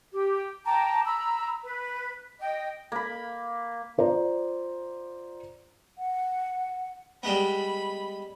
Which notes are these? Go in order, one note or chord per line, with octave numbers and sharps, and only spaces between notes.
G4
G5 A5 A#5 D6
A#5 B5 E6
B4
D#5 G5
A#3 B5
F4 C5 D5 A#5
F#5
G3 G#3 B3 B5